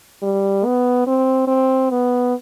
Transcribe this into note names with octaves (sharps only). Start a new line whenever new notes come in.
G3
B3
C4
C4
B3